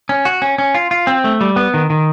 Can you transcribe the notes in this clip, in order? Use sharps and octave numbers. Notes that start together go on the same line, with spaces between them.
C#4
F#4
C#4
C#4
F4
F4
C4
A3
G3
B3
D#3
D#3